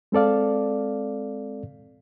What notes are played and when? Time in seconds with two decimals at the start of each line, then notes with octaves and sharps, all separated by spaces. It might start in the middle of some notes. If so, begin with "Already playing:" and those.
0.12 G#3 C4 A4 D5 F5